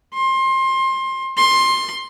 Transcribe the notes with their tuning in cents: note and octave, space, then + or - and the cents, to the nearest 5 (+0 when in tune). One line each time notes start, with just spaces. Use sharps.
C6 +25
C6 +15